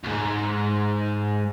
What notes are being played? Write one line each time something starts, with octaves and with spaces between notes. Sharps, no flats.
D2 G#2